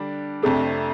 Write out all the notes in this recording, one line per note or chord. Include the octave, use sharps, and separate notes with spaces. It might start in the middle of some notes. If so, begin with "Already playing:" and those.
Already playing: D3 G3 D4
F2 C3 A3 D4